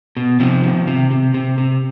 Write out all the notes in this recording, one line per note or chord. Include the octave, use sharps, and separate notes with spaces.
B2
C3 F3
D#3
C3
C3
C3
C3